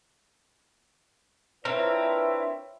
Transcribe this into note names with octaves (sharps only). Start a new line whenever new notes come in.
C4 D4 E4 F4 A#4 B4 C#5 E5